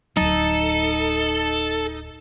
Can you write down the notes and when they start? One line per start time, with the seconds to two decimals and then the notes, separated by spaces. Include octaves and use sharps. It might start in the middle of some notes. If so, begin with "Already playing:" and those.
0.17 D1 F#3 D#4 A4